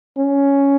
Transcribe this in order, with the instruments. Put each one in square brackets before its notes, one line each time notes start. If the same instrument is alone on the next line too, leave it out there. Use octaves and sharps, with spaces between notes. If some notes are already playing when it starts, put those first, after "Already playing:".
[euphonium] C#4